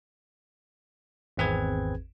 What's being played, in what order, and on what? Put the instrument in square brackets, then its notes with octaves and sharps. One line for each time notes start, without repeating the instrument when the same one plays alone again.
[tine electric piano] G#1 E2 C4 G#4 B4 G#6